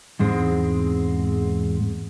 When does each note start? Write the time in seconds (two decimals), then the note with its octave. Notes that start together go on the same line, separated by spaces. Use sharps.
0.19 E2 G#2 G#3 C4